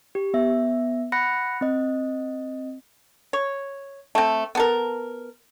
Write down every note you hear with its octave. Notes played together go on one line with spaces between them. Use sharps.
G4
B3 E5
F#5 B5 F#6 A#6 C#7
C4 D#5
C#5
A3 C4
B3 A4 A#4